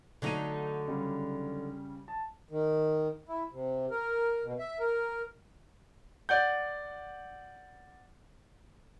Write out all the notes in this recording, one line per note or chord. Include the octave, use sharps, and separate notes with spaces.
D3 F#3 A3 D#4 D#7
C#3 G3
A5
D#3
E4
C3
A#4
B2
E5
A#4
D5 F#5 G6